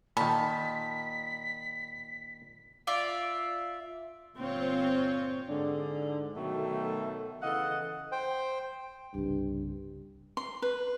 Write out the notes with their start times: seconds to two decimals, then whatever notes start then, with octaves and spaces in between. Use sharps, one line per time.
0.17 A#2 D#3 A5 B5 B6
2.87 F4 D5 E5
4.36 G1 A#2 C4 F4 C#5
5.49 G#2 D3 D4
6.35 B2 D#3 F#3 A3
7.42 C#3 E3 A4 D#5 F5 F#5
8.12 C5 G5
9.14 C2 G2 C#3
10.37 C6
10.62 B4